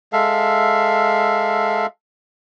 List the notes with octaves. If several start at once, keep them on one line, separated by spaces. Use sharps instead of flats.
G#3 A4 E5 F5